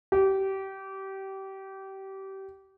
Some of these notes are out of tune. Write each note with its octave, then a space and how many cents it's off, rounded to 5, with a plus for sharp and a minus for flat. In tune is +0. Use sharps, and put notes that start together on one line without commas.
G4 -25